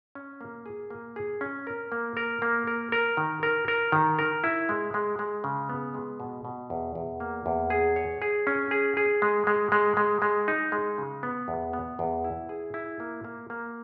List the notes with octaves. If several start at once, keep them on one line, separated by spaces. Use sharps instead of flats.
C#4
A#3
G#4
A#3
G#4
C#4
A#4
A#3
A#4
A#3
A#4
A#4
D#3
A#4
A#4
D#3
A#4
E4
G#3
G#3
G#3
C#3
B3
G#3
B2
B2
E2
E2
A#3
E2
G#4
C#5
G#4
C#4
G#4
G#4
G#3
G#3
G#3
G#3
G#3
D#4
G#3
C#3
B3
E2
B3
E2
E4
G#4
E4
A#3
A#3
A#3